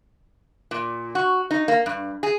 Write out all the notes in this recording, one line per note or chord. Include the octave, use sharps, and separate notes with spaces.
A#2
F#4
D#4
A#3
G2
G#4